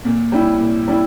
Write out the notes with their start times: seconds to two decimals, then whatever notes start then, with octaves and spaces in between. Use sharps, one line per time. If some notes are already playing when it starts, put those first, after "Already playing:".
0.05 A#2
0.32 G3 C#4 E4
0.59 A#2
0.88 G3 C#4 E4